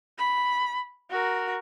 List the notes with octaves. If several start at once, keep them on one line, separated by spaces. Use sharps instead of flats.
B5
F#4 A#4